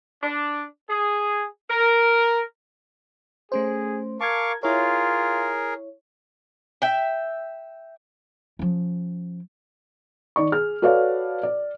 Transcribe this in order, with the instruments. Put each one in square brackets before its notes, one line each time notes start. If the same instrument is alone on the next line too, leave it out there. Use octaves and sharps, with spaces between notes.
[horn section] D4
G#4
A#4
[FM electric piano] A3 C#4 C5 [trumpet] G#4
[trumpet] A#4 [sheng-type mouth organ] F5 C#6 D6 [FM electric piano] A5 G#6
[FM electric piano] E4 C#5 [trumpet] F4 [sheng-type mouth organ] G#4 A#4
[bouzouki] E5 G5
[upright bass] F3 C#4
[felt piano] D#3 D5 C#6
G#4 F6
F#4 A4 B4 C#5 D5 F5
D5